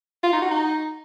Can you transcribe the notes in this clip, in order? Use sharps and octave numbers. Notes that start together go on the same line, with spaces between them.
F4
D#4
F#4
D#4